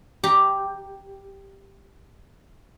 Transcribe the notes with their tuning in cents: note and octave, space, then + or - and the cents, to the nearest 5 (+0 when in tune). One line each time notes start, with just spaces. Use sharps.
G4 +0 A#5 +0